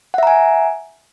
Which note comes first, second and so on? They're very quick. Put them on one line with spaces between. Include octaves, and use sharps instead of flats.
F#5 E5 A#5 G#5